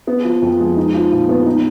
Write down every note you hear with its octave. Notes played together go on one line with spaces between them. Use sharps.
B3
F3
F2
G#3
D#4
F3
A#2
B3
D#4